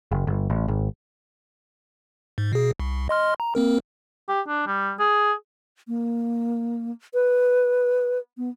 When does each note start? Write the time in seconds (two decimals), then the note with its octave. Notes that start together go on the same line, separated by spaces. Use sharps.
0.12 F#1
0.27 G1
0.50 A1
0.68 G#1
2.38 G#2
2.53 B2 G#4
2.80 C2
3.09 D#5 C6 F6
3.40 A#5
3.55 A#3 C4 A#4
4.29 G4
4.48 D4
4.67 G3
4.99 G#4
5.88 A#3
7.14 B4
8.38 B3